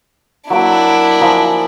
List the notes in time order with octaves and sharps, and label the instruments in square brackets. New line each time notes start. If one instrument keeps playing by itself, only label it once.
[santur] F#3 A#3 D6 [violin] D4 E4
[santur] F3 G#5 A#5